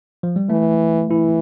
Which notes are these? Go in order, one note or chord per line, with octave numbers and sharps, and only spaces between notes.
F3
G3
E3 A3
E3 E4